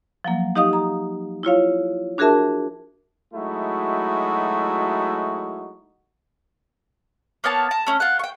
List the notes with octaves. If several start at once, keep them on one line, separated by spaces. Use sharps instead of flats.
F3 F#3 A#3
D#4 G4 D#5 F5 D#6
A#5
E4 F4 C#5 F5
D4 F#4 G#4 A#4 E5 A5
F#3 G#3 A3 D#4 E4 F#4
A#3 B3 C#5 A5
A5 A#5
A3 C#4
F4 F#5
G5 C#6